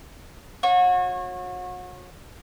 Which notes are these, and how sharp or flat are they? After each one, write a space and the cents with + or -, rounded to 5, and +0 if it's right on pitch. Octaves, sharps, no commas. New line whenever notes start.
F#4 -35 C#5 -25